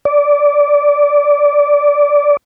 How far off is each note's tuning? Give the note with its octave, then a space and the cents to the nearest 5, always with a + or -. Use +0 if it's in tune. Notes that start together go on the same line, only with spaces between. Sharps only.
D5 -15